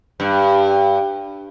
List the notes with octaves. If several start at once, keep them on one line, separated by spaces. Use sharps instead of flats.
G2